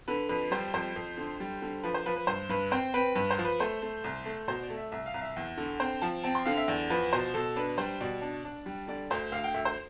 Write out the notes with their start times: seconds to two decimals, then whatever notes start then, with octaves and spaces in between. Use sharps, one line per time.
0.08 D3 B4
0.29 F2 B4
0.51 G3 C5
0.74 F2 C5
0.96 F2
1.18 D3
1.40 G3
1.62 D3
1.84 F3 B4
1.94 C5
2.06 F3 B4
2.16 B4
2.27 G2 C5
2.49 G2 B4
2.71 C4 C5
2.94 C4 B4
3.15 G2 B4
3.30 C5
3.38 F3
3.45 B4
3.60 A3 C5
3.82 A3
4.04 C2
4.26 A3
4.48 B2 C5
4.63 D5
4.70 A3
4.77 E5
4.92 C2 E5
5.06 F5
5.14 C2
5.22 E5
5.36 E2
5.58 D3
5.80 C4 C5
6.02 F3 A5
6.23 C4 A5
6.35 C6
6.45 D3 F5
6.57 E5
6.68 E2 D5
6.90 F3 B4
7.13 B2 C5
7.34 B2 A4
7.56 D4 B4
7.78 G3 C5
8.01 B2 D5
8.22 D4
8.45 D4
8.66 G3
8.88 D3 D5
9.11 D2 C5
9.32 D2 F5
9.44 G5
9.54 D2 E5
9.65 C5